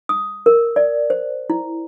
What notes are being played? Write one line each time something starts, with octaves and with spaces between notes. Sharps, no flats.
D#6
A#4
D5
C5
E4